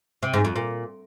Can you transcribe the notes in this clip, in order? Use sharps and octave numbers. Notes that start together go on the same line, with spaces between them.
C3
G#2
F2
A#2